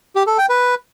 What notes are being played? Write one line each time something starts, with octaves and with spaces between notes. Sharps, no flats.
G4
A4
G5
B4